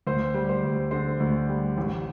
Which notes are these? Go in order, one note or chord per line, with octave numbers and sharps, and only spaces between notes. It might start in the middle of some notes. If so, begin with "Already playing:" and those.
D2 C5
G3
C5
D2
D3 C5
D2
G3
A1